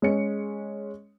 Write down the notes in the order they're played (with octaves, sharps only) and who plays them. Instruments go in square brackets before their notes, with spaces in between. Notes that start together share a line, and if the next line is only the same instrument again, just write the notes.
[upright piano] G#3 C#4 C#7